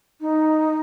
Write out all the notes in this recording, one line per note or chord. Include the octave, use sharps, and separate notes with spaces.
D#4